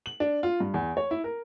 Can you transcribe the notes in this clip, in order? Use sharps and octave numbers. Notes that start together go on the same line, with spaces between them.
F#7
D4
F4
G2
E2
C#5
E4
A#4